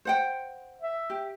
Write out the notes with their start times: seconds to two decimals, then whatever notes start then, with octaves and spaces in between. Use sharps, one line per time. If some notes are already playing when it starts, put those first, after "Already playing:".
0.05 C5 F#5 G5
0.81 E5
1.10 G4